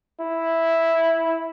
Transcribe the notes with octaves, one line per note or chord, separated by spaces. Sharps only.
E4